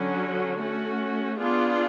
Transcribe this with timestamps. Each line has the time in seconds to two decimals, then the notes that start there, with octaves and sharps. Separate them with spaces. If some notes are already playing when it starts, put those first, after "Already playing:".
Already playing: D3 F#3 C#4 F#4
0.58 A3 C#4 F#4
1.38 B3 D4 F4 G#4 D5